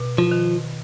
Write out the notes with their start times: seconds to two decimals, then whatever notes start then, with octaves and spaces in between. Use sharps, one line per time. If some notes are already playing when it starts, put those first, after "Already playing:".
Already playing: B2
0.18 F3
0.31 D#3